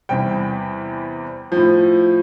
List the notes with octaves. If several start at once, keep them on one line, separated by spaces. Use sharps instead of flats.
E2 C3 G3 G5
A2 F3